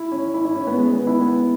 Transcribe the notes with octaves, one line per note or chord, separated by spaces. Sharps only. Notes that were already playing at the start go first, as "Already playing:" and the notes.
Already playing: E4
C#4
E4
E4
C#4
B3
G#3
B3
E4
B3